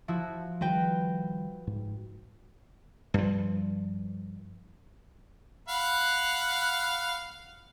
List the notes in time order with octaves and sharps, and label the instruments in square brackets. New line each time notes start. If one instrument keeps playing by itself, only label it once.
[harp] F3 E4 F#4
[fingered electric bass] D#3 F3 G3 [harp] F#4 B4 G5
[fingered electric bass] G#2
[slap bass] G2 F3
[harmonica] F5 F#5 B5